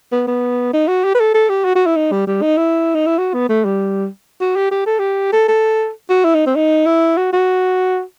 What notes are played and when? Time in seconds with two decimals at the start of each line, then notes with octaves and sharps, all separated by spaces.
0.12 B3
0.27 B3
0.73 D#4
0.88 F#4
1.04 G4
1.15 B4
1.20 A4
1.34 A4
1.49 G4
1.65 F#4
1.75 F#4
1.86 E4
1.97 D#4
2.12 G3
2.27 G3
2.42 D#4
2.57 E4
2.95 D#4
3.07 E4
3.18 F#4
3.34 B3
3.49 A3
3.65 G3
4.41 F#4
4.56 G4
4.71 G4
4.86 A4
4.99 G4
5.33 A4
5.48 A4
6.10 F#4
6.25 E4
6.35 D#4
6.46 C4
6.55 D#4
6.86 E4
7.17 F#4
7.32 F#4